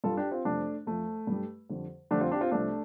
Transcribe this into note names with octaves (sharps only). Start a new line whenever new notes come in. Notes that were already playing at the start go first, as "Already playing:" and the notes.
G2 G3 F4 A4
D4 G4
C4 F4
F2 C3 G3 A3 D4
F2 F3 A3
G2 G3
F2 D3 G3
F2 D3 G3 A3 D4
C4 F4
D4 G4
C4 F4
C2 C3 F3 A3 D4